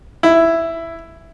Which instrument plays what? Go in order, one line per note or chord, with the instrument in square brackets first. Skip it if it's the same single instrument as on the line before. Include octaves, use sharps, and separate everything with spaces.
[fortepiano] E4